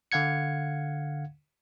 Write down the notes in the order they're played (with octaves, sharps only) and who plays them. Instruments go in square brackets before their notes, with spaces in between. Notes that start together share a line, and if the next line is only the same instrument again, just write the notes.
[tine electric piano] D3 F5 F#5 G#6 C#7